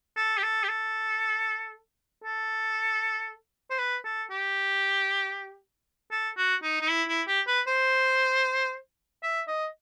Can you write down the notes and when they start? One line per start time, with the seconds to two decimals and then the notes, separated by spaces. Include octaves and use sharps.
0.16 A4
0.37 G4
0.43 A4
0.63 G4
0.68 A4
2.24 A4
3.70 C5
3.78 B4
4.05 A4
4.31 G4
6.12 A4
6.37 F#4
6.63 D#4
6.81 D#4
6.89 E4
7.08 E4
7.27 G4
7.47 B4
7.67 C5
9.23 E5
9.48 D#5